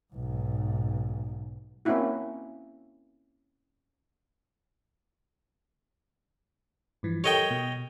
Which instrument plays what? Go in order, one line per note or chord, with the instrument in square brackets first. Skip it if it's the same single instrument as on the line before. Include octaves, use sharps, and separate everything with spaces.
[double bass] B1 G#2
[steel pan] A#3 C4 C#4 D#4 E4 F#4
[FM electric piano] G2 E3 F3
[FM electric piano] G4 A4 A#4 [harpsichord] C#5 D#5 G5
[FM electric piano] B2